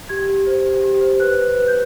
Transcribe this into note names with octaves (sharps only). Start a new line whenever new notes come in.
G4 G#6
G4
C5
G4
G4
C5
B4 F#6
B4
B4
G6